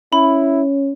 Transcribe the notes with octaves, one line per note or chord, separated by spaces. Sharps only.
C#4 E4 B5